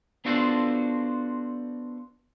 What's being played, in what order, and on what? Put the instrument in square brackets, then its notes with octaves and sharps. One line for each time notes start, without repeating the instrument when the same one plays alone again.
[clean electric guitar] B3 D4 F4 F#4 A4 C5